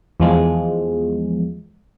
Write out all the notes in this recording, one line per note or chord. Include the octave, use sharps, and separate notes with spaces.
E2 F3 G#3